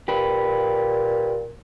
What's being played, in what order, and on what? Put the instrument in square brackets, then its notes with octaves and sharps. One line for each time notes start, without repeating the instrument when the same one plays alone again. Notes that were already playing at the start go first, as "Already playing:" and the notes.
[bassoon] A#2 [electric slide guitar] G4 B4